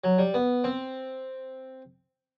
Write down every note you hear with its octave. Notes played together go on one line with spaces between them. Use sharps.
F#3
G3
B3
C4